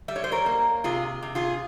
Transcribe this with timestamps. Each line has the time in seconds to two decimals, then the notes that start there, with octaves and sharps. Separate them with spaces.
0.08 G3 E5
0.16 C#5
0.24 C5
0.32 A#4 C#5
0.46 A#3
0.84 C3 F4 G#4
1.23 C3
1.35 F4 G#4